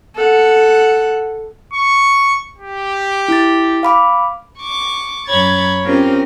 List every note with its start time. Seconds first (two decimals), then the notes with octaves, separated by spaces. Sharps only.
0.15 A4 F#5
1.73 C#6
2.58 G4
3.28 E4 A6
3.83 F5 B5 D6
4.59 C#6 D6
5.27 F#2 F#3 C#5 B5 G#6 A6
5.84 C4 C#4 F4 G4 A#4